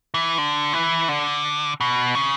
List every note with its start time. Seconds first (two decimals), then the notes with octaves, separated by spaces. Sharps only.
0.14 E3
0.38 D3
0.73 E3
1.09 D3
1.81 B2
2.15 C#3